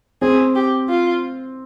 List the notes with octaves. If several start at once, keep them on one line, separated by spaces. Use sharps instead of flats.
C4 G#4
G4
F4